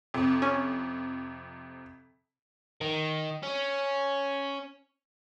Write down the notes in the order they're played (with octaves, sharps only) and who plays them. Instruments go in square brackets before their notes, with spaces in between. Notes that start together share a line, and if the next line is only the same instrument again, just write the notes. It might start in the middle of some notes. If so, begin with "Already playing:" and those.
[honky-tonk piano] F2 C3
[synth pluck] C#4
[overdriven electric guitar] D#3
C#4